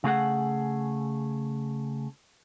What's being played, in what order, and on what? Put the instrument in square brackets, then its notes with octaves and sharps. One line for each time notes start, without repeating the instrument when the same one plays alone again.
[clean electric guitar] C#3 A3 G#4 F#5